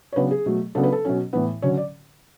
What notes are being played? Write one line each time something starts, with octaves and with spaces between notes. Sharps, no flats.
C#5
C#3 F#3 B3 D4 B4
G#4
B2 F#3 A3
C#3 F#3 B3 D4 A4
B4
A4
B2 F#3 C#4
A2 E3 B3 B4
D3 F#3 C#4 C#5
D5